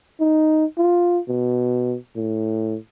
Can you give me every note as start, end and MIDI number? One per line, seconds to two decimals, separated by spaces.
0.20 0.65 63
0.78 1.19 65
1.28 1.97 47
2.16 2.77 45